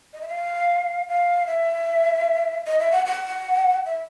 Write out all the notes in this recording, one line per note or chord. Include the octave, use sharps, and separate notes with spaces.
D#5
E5
F5
F5
E5
D#5
E5
F#5
F#5
E5